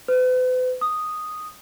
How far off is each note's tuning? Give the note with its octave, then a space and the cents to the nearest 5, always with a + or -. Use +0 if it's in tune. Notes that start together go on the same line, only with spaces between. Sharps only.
B4 +45
D#6 -5